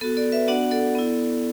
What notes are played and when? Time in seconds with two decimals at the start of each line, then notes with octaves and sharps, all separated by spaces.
0.01 B3 F#4 A4
0.17 A4 D5
0.32 B4 E5
0.48 B3 D4 F#4 D5 F#5
0.71 A4 D5
0.95 B3 E4